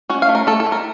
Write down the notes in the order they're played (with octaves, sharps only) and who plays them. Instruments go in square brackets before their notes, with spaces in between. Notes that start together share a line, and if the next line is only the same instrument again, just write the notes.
[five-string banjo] C#4 F#4
F5
A3
A#4
A3 A4
A4
A3
A#4